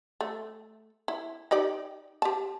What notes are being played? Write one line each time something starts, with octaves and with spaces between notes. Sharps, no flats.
A3
E4
D#4 G4 D5
G4 A5